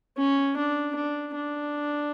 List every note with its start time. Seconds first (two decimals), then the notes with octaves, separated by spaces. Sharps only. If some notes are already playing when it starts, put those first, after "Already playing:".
0.17 C#4
0.57 D4
0.96 D4
1.35 D4